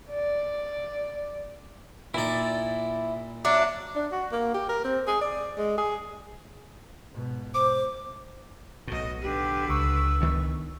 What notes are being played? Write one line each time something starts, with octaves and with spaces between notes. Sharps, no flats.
D5
A#2 D#4 E4 D5
F#3 D4 E5 D6
D4
F#4
A#3
G4
A#4
C4
G#4
D5
G#3
G#4
G#2 B2
C5 D6
B1 A2 F#4 D#5
D3 G4 B4
C#2 C#6 E6
D2 D#3 B3